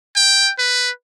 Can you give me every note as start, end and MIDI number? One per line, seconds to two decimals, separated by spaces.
0.16 0.51 79
0.59 0.90 71